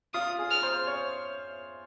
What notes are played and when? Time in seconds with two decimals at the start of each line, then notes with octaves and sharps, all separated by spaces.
0.14 F4 D#6
0.39 G#4
0.51 F6
0.63 C5
0.87 C#5